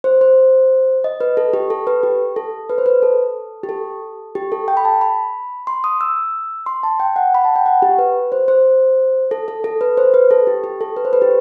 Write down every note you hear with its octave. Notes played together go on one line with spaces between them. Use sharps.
C5
C5
D#5
B4
A4
G4
A4
B4
G4
A4
B4
C5
B4
A4
G4
A4
G4
A4
G5
B5
A5
B5
C6
D#6
E6
C6
A5
G5
F#5
B5
A5
G5
F#5
G4
B4
C5
C5
A4
A4
A4
B4
C5
B4
A4
G4
G4
A4
B4
C5
B4
G4